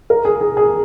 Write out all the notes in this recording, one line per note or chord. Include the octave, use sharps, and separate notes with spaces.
A#4
G#4
G#4
G#4